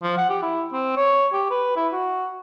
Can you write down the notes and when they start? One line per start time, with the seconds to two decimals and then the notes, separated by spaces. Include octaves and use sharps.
0.03 F3
0.17 F#5
0.29 G4
0.42 E4
0.73 C4
0.97 C#5
1.33 G4
1.51 B4
1.76 E4
1.93 F#4